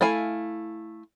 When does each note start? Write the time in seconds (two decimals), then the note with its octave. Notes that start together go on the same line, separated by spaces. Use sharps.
0.01 A3 E4 F5 G#5